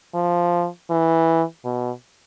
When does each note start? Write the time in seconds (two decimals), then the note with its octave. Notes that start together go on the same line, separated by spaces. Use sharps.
0.15 F3
0.90 E3
1.65 B2